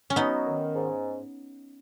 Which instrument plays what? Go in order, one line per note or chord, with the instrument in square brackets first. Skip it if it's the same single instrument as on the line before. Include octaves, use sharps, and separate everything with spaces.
[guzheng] C#4
[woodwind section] F#3 [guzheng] B3 D#4
[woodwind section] D#3
G#2